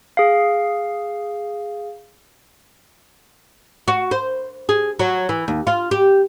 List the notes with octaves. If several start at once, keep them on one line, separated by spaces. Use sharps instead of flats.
G#4 F5
F#4
C5
G#4
F#3
E3
D#2
F4
G4